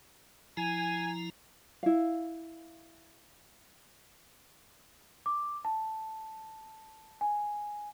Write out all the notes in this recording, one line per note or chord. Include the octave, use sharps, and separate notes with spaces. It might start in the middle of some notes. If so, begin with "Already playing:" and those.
F3 E4 G#5 A#5
E4 F5
D6
A5
G#5